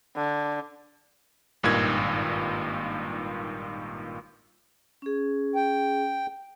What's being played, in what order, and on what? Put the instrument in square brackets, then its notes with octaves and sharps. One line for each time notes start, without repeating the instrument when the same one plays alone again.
[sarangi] D3
[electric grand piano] G#1 G2 A#2 D#3 G#6
[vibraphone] C#4 G#4
[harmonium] G5